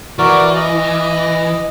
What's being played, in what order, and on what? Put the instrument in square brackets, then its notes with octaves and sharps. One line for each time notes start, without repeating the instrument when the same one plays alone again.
[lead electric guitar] E3 [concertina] F#4 A#4 D5
[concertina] D#5